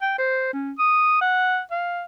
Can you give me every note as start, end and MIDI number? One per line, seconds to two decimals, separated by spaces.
0.02 0.14 79
0.18 0.48 72
0.53 0.72 61
0.79 1.21 87
1.21 1.60 78
1.71 2.03 77